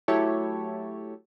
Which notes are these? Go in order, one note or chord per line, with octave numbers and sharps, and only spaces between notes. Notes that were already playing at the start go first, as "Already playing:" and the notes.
F#3 A3 E4 G4 A4 C#5